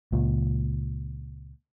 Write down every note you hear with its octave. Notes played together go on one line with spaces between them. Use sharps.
C#2 A#2